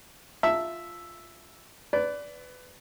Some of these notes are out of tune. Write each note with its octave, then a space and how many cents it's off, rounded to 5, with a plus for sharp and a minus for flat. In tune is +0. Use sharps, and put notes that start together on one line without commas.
F4 -5 E5 +0 A5 +0
B4 +20 D5 -15